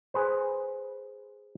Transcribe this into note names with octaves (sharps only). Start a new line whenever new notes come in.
G#4 B4 C5